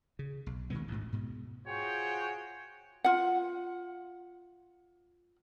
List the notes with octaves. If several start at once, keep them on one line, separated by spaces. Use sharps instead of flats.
C#3
B1
A#2 D#3 G#3 B3
A1 D2 G#2
G#2 B2
F4 F#4 G#4 C5 C#5 G5
F4 F#5